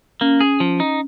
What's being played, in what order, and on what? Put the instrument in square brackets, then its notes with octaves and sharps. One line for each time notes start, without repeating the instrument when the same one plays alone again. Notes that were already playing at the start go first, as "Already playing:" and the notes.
[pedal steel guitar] A#3 [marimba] C#4
[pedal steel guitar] G#4
F3
D#4